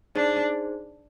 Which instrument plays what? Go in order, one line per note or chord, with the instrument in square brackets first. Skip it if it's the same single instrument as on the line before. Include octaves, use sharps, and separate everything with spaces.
[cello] D4 [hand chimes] D#4 G#4 C5